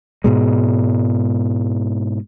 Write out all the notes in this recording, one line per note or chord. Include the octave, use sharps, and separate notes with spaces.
G#2 B2 G#3